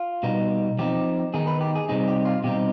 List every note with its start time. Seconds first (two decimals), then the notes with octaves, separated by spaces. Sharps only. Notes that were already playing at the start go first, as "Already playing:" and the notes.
Already playing: F4
0.23 B2 G3 B3 D#4
0.79 F3 C4 D#4 G4
1.34 D#3 B3 D#4 G#4
1.47 B4
1.61 G4
1.75 G#4
1.89 C3 G3 C4 D#4 G#4
2.08 G4
2.25 F4
2.44 B2 G3 C4 D#4 G4